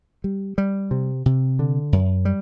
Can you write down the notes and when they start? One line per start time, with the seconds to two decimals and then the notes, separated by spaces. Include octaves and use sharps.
0.24 G3
0.58 G3
0.91 C3
1.26 C3
1.59 D3
1.93 F#2
2.25 G3